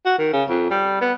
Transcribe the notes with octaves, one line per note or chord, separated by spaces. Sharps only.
F#4
D#3
C#3
F2
G3
B3